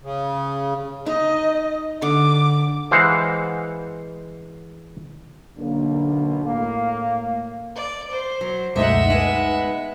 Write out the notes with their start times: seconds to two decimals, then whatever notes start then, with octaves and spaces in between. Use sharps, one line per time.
0.02 C#3
1.06 D#4 D#5
2.02 D3 D6
2.91 E3 G#3 C5 F5 F#5
5.58 B1 D3 A#3 D4
6.45 A2 A#3 F5
7.76 D5
8.11 C5
8.41 F#3
8.76 C#2 F#2 B2 G#3 A3 D#4 E5 F#5
9.10 G#3 B3 D#4